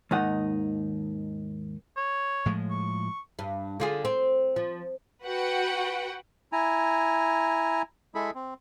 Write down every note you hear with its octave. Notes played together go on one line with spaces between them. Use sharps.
D#2 G#2 D#3 D#4 F#5
C#5
A2 F3 G#3
C#6
G2
D3 F4 G#4
C4
F3
F#4 B4 F#5 G5
E4 G#5 A#5
G#3 E4 G#4 A4 B5
C4